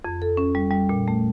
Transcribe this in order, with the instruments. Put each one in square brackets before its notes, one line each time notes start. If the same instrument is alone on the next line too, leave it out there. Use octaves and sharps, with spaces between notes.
[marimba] F2
A4
C#4
G3
G3
A#2
A3